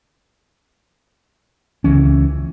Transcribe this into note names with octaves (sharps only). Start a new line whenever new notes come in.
C#2 E3 C#4